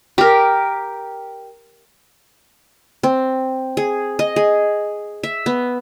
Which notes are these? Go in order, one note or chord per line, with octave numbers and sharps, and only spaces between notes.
G4 A#4
C4
G#4
D#5
G#4
E5
B3